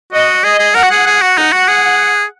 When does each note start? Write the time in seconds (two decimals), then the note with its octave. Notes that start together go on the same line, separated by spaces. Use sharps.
0.13 F#4 D#5
0.44 G#4 D#5
0.59 G#4
0.75 A#4 F#5
0.83 F#4
0.91 G#4
1.07 G#4
1.22 F#4
1.38 D#4 F#5
1.53 F#4
1.68 G#4